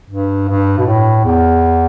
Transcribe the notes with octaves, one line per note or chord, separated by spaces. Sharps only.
G2
G2
B2
A2
E2